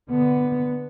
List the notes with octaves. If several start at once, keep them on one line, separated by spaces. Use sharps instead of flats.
D3 B3